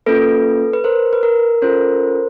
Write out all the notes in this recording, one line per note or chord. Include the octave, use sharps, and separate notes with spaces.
A#3 C#4 F4 A4 B4
B4
A#4 C5
B4
A#4
C#4 F4 A4 A#4 C5